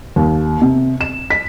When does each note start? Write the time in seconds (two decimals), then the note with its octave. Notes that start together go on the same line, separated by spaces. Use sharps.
0.16 D#2
0.62 C3
1.01 E7
1.30 B6